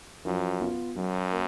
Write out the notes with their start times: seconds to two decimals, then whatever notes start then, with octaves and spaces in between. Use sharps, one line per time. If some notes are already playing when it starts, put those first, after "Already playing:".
0.25 F#2 F3
0.60 B3 F4
0.96 F#2 F#3
1.32 A#3